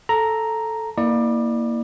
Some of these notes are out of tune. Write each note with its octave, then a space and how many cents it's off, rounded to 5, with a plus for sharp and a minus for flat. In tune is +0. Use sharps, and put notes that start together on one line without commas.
A4 -5 A#5 +0
A#3 +0 E4 -25 D5 +25